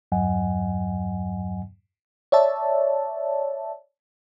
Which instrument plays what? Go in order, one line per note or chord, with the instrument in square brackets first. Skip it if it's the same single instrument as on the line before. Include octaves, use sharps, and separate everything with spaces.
[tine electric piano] E2 G2 F#3 D#5 F#5 G#5
[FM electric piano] C#5 D5 E5 A5